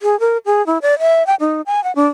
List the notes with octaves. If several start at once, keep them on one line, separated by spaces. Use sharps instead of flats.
G#4
A#4
G#4
E4
D5
E5
G5
D#4
G#5
F#5
D4